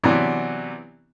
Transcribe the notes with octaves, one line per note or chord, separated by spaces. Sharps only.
C3 E3 F#3 B3 D4